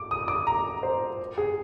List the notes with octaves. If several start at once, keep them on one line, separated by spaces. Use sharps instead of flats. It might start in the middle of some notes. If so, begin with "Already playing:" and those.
Already playing: D6
D#6
D6
A#5
C5
G#4